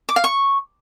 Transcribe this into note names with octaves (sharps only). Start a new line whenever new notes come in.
D6
F5
C#6